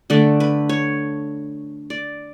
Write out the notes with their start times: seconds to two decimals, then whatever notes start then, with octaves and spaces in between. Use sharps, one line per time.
0.10 D3 A3 D5
0.40 B4
0.69 C#5
1.90 D5